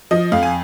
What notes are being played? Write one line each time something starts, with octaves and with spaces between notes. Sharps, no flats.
F3 D#5
F2 F5
G#5